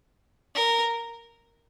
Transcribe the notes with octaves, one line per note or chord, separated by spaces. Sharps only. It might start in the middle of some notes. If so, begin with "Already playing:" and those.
A#4